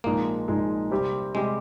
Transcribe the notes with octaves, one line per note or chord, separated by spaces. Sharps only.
A#1 G#2 F3 G#3 A#3 D#4
A#1 G#2 F3 G#3 D#4
C3 G3 C4 G4
C3 G3 G#3 C4 G4